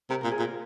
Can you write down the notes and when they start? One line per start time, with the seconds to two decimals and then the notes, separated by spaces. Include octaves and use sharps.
0.10 C3 A#4
0.21 A#2 A#4
0.31 G#4
0.39 A#2
0.43 A#4